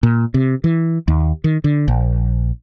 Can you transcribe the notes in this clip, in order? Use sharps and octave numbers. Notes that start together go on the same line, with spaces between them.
A#2
C3
E3
D#2
D#3
D3
A#1